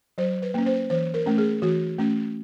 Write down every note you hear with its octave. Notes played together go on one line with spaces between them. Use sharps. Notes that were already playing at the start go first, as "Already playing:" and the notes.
F#3 C5
B4
A#3 C#4
C5
E3 C5
A#4
A3 C#4
G#4
E3 F#4
A3 C#4